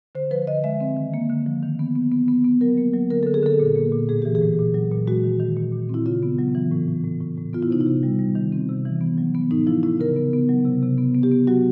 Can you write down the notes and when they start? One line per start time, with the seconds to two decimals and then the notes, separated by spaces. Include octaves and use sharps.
0.15 D3 C5
0.31 F3 B4
0.47 D3 D#5
0.64 G#3 E5
0.81 C4
0.97 D#3
1.14 A#3
1.29 D3
1.46 F3
1.63 D#3
1.79 B3
1.96 B3
2.12 B3
2.28 B3
2.44 B3
2.61 F#3 A#4
2.77 A#3
2.94 F#3
3.10 D3 A#4
3.23 D3 A4
3.34 G#4
3.43 D3 A4
3.60 A#2
3.76 A#3
3.92 A#2
4.09 A2 G#4
4.22 E3 G4
4.35 G#4
4.41 A2
4.59 A#2
4.74 F#3
4.91 A#2
5.07 G#3 F#4
5.24 D#3
5.40 D#3
5.57 A#2
5.73 A#2
5.89 C4 E4
6.06 C#3 F4
6.23 B3
6.39 F#3
6.55 E3
6.71 A2
6.88 A2
7.04 A2
7.21 A2
7.37 A2
7.53 B3 F4
7.62 E4
7.71 C3 D#4
7.81 E4
7.87 C3
8.03 G3
8.19 G3
8.35 D#3
8.52 C4
8.69 C3
8.85 E3
9.01 B3
9.18 F#3
9.35 B3
9.51 A2 D#4
9.67 F3 E4
9.83 A2 E4
10.00 C#3 A#4
10.16 B3
10.33 B3
10.49 F#3
10.65 C3
10.83 C3
10.98 B3
11.15 B3
11.23 G4
11.32 B3
11.47 F#3 F#4